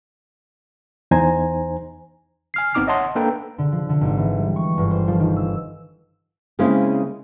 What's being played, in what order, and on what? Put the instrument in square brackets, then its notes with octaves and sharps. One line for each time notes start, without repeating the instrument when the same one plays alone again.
[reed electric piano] E2 D#4 C5 G#5 A#5
[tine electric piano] G#5 F6 C7
G#1 B3 C4 D#4 D6 F6
C#5 D#5 E5 F#5 A5 C6
A#3 D4 A4 B4 G5 A#5
[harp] D3
F3
D3
G#1
E3
G3
C#6
G1
C5
F3
D#3
E6
[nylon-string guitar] C#3 G#3 A#3 C4 C#4 E4